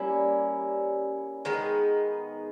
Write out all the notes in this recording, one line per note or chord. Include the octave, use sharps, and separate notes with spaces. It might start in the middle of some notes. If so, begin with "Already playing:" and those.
Already playing: G3 A#3 C#4 E4
D#3 G#3 B3 D#4